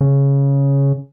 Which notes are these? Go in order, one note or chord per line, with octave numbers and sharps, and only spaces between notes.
C#3